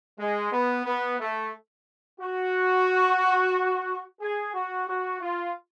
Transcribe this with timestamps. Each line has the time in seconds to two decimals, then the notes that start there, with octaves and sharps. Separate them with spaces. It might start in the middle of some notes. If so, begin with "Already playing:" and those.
0.19 G#3
0.52 B3
0.86 B3
1.20 A3
2.20 F#4
4.21 G#4
4.54 F#4
4.88 F#4
5.21 F4